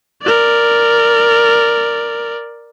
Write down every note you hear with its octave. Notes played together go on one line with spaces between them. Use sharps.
A#4 D5